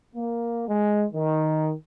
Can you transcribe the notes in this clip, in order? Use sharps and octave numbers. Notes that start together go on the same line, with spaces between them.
A#3
G#3
D#3